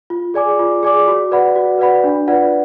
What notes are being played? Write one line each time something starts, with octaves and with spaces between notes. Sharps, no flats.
F4
G#4 D5 G#5 D6
F4
G#4 D5 G#5 D6
F#4
B4 D5 F#5 B5
F#4
B4 D5 F#5 B5
D4
F4 B4 D5 F#5